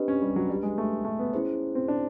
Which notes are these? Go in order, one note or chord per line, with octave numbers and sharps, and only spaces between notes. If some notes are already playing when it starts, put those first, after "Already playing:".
Already playing: C4 D4 G4 B4 D#5
C#4
G3
F#3
G3
G#3
A3
A3
B3
C#4 E4 G#4 C5
C4
D4